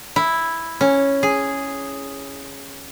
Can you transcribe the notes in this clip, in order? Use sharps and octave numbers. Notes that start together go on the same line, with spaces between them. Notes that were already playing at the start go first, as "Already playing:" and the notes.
E4
C#4
G#4